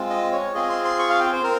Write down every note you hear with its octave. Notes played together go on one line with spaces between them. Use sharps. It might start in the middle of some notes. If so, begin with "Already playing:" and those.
Already playing: G#3 C4 F4
D#5
C#5
C4 F4 G#4 D#5
C6
C6
C#6
F5
G5
C5
C4 A#4